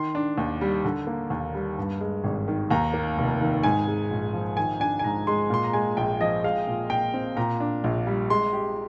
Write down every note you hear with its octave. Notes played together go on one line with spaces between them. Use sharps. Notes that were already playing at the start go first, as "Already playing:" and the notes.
Already playing: D#3 C6
D4
D#2
G3
D3
A#3
D#2
G3
G2
G#3
G#1
D#3
D#2 A#5
A#3
F1
D#3
G#2 G#5
G#3
A#1
F3
D#3 G#5
D4 G#5
G#5
G#2 A#5
G#3 C6
A#2 C6
A#5
G#3 G#5
A#1 G5
F3 D#5
G#3 F5
A#2
A#2 G5
C4
A#2 A#5
D4
A#1
G3
G#3 C6
G4